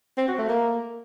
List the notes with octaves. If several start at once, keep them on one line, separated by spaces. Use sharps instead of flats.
C4
F#4
A3
A#3